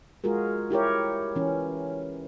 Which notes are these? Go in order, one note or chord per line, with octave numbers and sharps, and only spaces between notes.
G#3 F4 F#4 G#4 A#4
E4 G4 A#4 C#5
E3 C#4